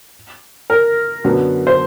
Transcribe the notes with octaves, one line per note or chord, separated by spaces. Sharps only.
A#4
F#2 D3 F#3 B3
C5